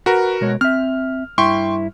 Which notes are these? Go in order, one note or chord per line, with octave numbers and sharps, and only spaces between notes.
F#4 A#4 B4
B2 G#3 C#5
C4 E5 F6
G2 E4 G5 C6 C#6